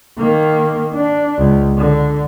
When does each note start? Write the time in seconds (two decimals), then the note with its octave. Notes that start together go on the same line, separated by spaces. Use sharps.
0.18 D#3 A#3
0.94 D4
1.39 C#2
1.77 D3